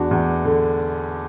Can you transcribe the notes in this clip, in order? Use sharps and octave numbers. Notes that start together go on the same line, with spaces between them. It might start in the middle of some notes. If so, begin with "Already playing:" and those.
Already playing: E2 D4 F#4
E2
D3